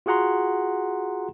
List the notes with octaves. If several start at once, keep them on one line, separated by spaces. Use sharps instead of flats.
F4 F#4 G#4 F#5 A#5 C6